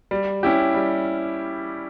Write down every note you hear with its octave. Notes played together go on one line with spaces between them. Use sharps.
G3
C#4 E4 G4
G3